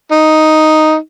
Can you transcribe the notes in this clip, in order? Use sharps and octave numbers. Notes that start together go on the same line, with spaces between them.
D#4